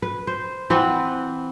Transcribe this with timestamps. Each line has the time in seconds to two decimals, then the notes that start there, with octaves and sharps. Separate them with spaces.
0.02 B4
0.27 C5
0.70 E3 C4 B4 F#5